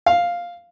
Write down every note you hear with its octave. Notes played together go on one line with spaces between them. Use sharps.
F5